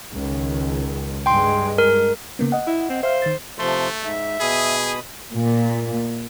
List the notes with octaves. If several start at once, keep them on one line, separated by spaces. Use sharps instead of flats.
C#2 D#3
G2 G#3 G5 C6
A#4
C#3 A#3 B3
D#5 F#5
E4
C4
C5 E5 F5
D#3 A6
C3 F3 A3 C6
G#2 E5
B2 G#4 B5 D#6
A#2